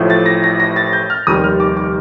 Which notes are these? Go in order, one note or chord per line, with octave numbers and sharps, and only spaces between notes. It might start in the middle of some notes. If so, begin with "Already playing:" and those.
Already playing: A1 A2 F3 A3
A6
A#6
A#6
A#6
A6
G6
F6
F1 D#2 D#3 G3 D#6
F6
D6
D6